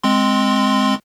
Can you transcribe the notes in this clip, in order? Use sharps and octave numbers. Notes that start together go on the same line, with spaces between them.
G#3 C4 C6